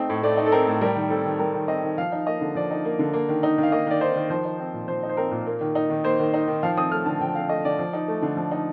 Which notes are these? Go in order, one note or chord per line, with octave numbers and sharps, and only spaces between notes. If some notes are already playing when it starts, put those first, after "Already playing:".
Already playing: A3 C4 D#4
A2
A3 D5
D#4
A4
C4 A#4
A2
G3 A#4
D#3
C4 A4
D#3
G3 A#4
D#3
C4 D#5
D#3
F3 F5
D#4
A#3 D#5
D3
F3 D5
D#4
A#3
D3
A#3
D#3
D#4
D#3 F5
A#3 D#5
D#3 D5
D#4 C5
D#3
F3 C5
D#4
C4
A#2
F3 C5
D#4
C5
C4 A#4
A#2
A#3
D#3
D#4
D#3
A#3 C5
D#3
D#4
D#3
F3 F5
C4 D#6
A3 F6
D3 A5
F3 G5
C4 F5
A3 D#5
D3 D5
F3
D#4
A3
D3
F3
D#4